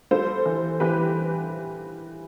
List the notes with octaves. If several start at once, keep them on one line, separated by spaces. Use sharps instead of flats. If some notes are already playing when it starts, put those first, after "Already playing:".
G3 A4 C5
E3
E3 G4 B4